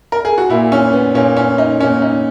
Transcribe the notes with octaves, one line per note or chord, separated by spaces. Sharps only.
A#4
G#4
F#4
A#2 A#3 E4
C#4
B3
A#2 A#3 C#4
C#4
D#4
A#2 A#3 C#4
D#4